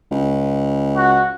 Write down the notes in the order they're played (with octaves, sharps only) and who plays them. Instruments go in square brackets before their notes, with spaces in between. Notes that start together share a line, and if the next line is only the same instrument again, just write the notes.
[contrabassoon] C#2
[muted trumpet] F#4